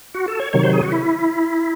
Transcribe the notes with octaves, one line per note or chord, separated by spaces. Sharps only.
F#4
A4
C#5
C3 D#3 F#3 C#5
C5
G#4
F#4
E4